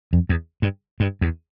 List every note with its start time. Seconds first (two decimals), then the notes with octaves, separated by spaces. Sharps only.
0.13 F2
0.29 E2
0.62 G2
1.00 G2
1.21 E2